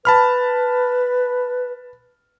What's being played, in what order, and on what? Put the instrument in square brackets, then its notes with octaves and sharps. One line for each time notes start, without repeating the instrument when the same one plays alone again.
[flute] B4 [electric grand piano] A5 B5 F6